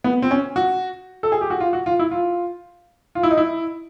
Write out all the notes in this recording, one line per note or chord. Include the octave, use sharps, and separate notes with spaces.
B3
C4
C#4
F#4
A4
G#4
G4
F#4
F4
F#4
F4
E4
F4
F4
E4
D#4
E4